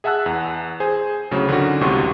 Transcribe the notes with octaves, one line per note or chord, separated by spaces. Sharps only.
G#4 E5 F#5 A5 E6 F#6
E2
G#4 C5 G#5
D2 A2 C#3 F#3
D3 D#3 C#4 F#4
G1 C#2 A2 C3 C6 C#6